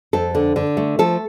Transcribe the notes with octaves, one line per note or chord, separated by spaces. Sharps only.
F2 A4
D3
D3
A3
F3 A4